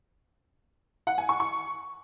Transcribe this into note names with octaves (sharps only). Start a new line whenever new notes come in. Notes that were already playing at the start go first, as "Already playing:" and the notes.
F#5
G#5
C#6
C#6